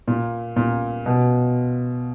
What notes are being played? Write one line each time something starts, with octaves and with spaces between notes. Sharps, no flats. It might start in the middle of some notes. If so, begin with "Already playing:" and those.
A#2
A#2
B2